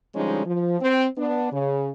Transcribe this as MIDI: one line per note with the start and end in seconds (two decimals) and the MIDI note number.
0.15 0.43 50
0.15 0.43 53
0.15 0.43 55
0.15 0.43 56
0.15 0.43 61
0.15 0.43 63
0.46 0.77 53
0.81 1.07 60
1.18 1.49 59
1.18 1.49 62
1.52 1.90 49